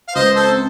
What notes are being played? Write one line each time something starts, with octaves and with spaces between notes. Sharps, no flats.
F5
C#2 C5 D#5
A4 C5
C4